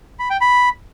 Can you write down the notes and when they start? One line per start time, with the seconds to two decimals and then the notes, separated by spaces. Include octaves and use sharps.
0.19 B5
0.30 G5
0.41 B5